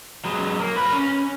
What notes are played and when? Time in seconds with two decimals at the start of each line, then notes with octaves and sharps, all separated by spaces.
0.25 F#3 G#3
0.60 A#3
0.76 A#4 B4
0.93 C#4